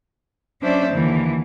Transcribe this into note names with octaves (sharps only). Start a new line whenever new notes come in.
F#3 C#4 D4 C5 D5 E5
D#2 D3 E3